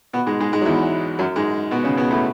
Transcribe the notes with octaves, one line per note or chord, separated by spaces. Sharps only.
B2 B3
G#2 G#3
G#2 G#3
G#2 G#3
F#3
E2 E3
F#2 F#3
G#2 G#3
B2 B3
C#3 C#4
B2 B3
A2 A3